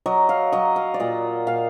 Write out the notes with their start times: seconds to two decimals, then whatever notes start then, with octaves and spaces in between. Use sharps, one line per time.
0.06 F#3 D#5
0.29 F5
0.52 F#3 D#5
0.76 F5
0.94 D5
1.00 A#2 D#5
1.47 A#2 F5